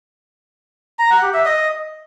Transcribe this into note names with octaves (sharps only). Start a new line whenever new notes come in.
A#5
F#5
G4
E5
D#5